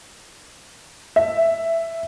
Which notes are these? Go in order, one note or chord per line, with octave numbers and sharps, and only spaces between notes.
E5